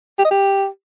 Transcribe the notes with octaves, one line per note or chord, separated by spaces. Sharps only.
G4
D#5
G4